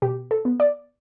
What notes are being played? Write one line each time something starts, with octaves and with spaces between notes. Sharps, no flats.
B2 G4
A4
B3
D5